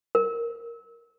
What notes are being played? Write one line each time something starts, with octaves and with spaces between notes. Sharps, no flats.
A#4